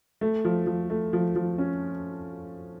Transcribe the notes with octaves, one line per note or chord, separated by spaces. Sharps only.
A3
F3
F3
A3
F3
F3
C#4